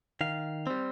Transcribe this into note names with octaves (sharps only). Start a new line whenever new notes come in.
D#3 F5
G3 C4